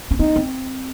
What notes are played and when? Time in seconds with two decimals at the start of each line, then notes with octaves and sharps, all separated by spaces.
0.11 C#4
0.19 C4 D#4
0.36 C4